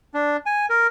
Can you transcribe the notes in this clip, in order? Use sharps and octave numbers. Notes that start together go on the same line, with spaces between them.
D4
G#5
A#4